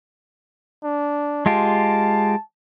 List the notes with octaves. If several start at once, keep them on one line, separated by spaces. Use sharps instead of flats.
D4
G#3 F4 G4 A5